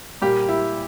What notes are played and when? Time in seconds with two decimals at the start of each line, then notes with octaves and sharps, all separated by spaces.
0.22 A#2 G3 A#3 G4
0.49 E4